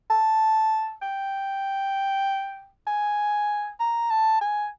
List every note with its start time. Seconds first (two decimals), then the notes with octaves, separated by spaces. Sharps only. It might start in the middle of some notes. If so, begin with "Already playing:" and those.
0.10 A5
1.02 G5
2.87 G#5
3.80 A#5
4.11 A5
4.41 G#5